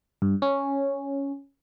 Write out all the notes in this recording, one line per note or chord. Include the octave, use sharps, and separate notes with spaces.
G2
C#4